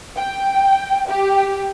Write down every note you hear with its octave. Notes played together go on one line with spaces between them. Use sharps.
G5
G4